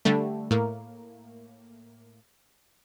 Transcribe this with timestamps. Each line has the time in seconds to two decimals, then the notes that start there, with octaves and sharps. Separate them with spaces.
0.05 D3 G3 A3
0.51 A2 A#3